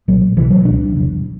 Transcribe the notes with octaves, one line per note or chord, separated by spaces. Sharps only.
B1 A#2 F#3
B1 B2 E3
F#3
C#2 B2 D4
E1 E2 C#3